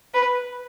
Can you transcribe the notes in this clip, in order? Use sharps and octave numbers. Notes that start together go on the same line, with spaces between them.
B4